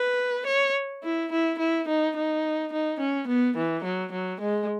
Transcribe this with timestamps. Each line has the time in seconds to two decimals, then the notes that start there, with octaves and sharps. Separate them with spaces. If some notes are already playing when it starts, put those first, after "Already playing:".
Already playing: B4
0.47 C#5
1.04 E4
1.32 E4
1.59 E4
1.88 D#4
2.16 D#4
2.72 D#4
3.00 C#4
3.28 B3
3.57 E3
3.84 F#3
4.12 F#3
4.41 G#3